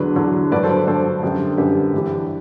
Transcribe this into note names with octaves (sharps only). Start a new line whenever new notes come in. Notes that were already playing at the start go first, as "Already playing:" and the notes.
Already playing: E2 D3 F#3 B4
E2 D3 F#3
G2 D3 F#3 B4 D5
A4 C5
G2 D3 F#3 A4 C5
F#2 D3 G3
F#2 D3 G3 G4 B4
G2 E3 G3